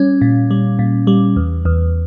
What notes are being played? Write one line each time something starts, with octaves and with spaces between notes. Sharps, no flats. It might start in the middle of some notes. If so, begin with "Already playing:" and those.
Already playing: G3 C#4
A#2
G3
A#2
G3
E2
E2